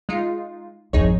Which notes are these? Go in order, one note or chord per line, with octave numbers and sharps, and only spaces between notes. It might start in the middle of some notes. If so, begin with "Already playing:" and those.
G#3 D#4 F4
G#1 F2 D#4 G#4 C#5